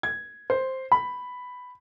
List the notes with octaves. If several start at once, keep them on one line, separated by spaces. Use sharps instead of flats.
G#6
C5
B5